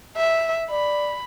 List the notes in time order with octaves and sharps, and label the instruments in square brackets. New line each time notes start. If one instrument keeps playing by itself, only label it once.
[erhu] E5
[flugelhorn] D5 [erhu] B5